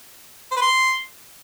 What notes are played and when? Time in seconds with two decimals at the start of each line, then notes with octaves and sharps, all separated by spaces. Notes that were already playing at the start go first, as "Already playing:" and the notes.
0.51 C5
0.56 B4
0.62 C6